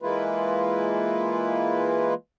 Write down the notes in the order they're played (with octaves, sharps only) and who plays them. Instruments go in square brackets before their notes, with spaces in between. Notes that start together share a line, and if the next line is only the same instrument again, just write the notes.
[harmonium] E3 G#3 A#3 E4 F4 B4